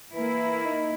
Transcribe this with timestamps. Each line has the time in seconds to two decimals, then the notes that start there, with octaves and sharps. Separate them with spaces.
0.14 E3 A#3 E4
0.65 D#4